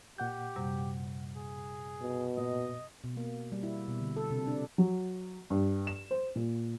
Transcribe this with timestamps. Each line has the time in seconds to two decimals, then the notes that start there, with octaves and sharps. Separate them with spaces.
0.18 A#2 G4 F#5 G6
0.56 F#2 C3 G3
1.37 G#4
2.02 B2
2.37 A#2 D#5
3.04 B2
3.17 A#3
3.52 G3
3.63 E4
3.88 B2
4.01 D3
4.16 A4
4.31 C3
4.47 D4
4.78 F#3
5.50 G2
5.87 E7
6.11 C5
6.36 A#2